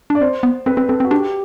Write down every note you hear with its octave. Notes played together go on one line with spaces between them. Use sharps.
D4 D5
C4 C5
B3
C4 B4
C4 B4
C4 A4
C4
F#4
D4 G4